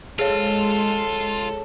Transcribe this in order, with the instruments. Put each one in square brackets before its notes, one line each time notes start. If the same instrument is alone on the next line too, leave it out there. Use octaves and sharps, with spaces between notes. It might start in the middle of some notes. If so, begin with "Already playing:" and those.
[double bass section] G#3 [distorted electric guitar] F4 [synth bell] G#4 C#5 [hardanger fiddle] A4